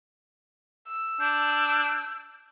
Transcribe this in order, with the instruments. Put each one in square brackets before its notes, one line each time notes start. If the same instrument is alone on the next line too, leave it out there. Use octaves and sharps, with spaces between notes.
[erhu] E6
[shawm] D4 [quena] G6